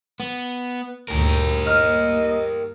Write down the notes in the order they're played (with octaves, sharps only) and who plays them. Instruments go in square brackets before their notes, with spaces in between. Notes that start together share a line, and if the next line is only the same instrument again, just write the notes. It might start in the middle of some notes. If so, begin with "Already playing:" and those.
[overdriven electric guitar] B3
[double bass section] D2 G2 A#2 [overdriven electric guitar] G4 A#4
[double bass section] G2 A#3 [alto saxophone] D#5 [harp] F6